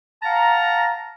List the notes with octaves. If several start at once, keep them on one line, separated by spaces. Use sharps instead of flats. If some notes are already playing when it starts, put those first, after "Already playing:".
F5 F#5 A5 A#5